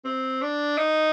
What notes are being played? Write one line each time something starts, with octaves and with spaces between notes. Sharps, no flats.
C4
D4
D#4